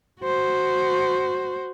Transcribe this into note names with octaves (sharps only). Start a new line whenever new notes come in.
F#4 C5